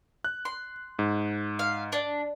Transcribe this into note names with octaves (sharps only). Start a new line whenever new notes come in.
F#6
C6
G#2
F5
D4